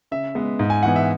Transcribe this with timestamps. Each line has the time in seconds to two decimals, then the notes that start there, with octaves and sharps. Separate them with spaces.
0.11 C#3 E5
0.35 G#3 B3
0.59 G#2
0.70 G#5
0.83 E3 B3 F#5
0.96 E5